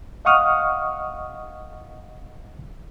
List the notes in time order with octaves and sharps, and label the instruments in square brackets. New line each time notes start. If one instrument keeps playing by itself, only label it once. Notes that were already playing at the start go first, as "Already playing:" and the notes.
[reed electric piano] D#5 F5 F#5 C#6 D#6 F6